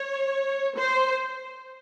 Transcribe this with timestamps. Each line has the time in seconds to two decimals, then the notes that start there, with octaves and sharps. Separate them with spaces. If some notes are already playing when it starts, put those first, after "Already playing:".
Already playing: C#5
0.76 C5